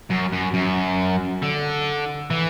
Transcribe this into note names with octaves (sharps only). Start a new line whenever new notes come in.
F#2
F#2
F#2
D3
E3